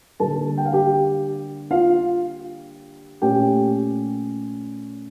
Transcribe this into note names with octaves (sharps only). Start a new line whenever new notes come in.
D3 G3 A#3 A4 A5
G5
F5
G4 G5
F4 F5
A#2 A3 C#4 G4 G5